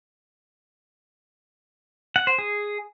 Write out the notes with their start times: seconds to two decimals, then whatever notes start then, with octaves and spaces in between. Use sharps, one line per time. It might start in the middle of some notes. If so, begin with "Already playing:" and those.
2.16 F#5
2.27 C5
2.38 G#4